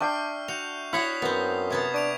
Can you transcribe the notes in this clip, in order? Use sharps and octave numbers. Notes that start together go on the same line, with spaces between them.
D4 E5 G5 C#6 F6 C7
F#4 G6 F7
E4 F#4 C#5 F#5 D#6 B6 C7
F#2 B3 C4
C3 B3 A5 D#6 G#6
D4 C#6 D7 F7